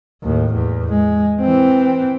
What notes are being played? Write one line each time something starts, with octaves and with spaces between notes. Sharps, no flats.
D#2 A2
E2
G#3
E3 C4